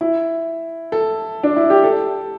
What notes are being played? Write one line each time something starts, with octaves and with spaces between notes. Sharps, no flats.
E4
A4
D4
E4
G4
A4